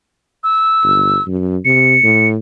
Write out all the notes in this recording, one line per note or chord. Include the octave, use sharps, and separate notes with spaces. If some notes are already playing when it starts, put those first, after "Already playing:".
E6
G1
F#2
C3 C#7
A2